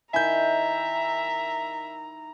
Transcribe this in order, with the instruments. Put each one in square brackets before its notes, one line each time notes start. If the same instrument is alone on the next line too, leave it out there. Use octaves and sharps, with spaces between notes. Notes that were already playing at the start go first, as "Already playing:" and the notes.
[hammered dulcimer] D#3 E4 [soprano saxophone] E5 [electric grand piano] G#5 G6 [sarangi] A#5